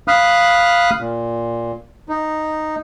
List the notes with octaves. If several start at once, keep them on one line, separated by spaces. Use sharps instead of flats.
F5 B5 D#6 F6 F#6
A#2
D#4